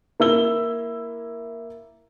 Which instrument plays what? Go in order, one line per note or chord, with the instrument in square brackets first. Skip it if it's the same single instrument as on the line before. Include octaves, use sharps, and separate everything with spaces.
[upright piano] A#3 E4 E6 G7